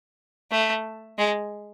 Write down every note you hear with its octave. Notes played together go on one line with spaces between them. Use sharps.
A3
G#3